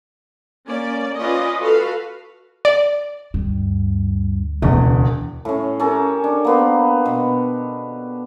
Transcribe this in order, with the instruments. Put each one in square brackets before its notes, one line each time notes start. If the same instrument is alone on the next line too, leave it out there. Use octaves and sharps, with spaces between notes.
[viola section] A#3 C#4 D5
C#4 F4 B4 D5 D#5
F#4 A4 B4 F5
[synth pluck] D5
[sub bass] D2 [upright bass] G2
[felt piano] E1 E2 [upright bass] C#3
[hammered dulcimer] A2 C#4
C#4 G4 A4 A#4
D4
A#3 B3 C5
B2